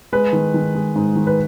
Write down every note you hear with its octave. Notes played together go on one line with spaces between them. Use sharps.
G#3 B4
D#3
D#3
G#3
G#2
D#3
B4